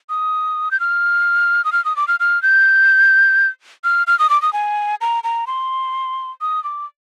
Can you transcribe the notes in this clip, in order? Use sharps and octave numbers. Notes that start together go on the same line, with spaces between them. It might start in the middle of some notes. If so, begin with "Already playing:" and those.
D#6
G6
F6
D#6
F6
D#6
D6
F6
F6
G6
F6
F6
D#6
D6
D#6
G#5
A#5
A#5
C6
D#6
D6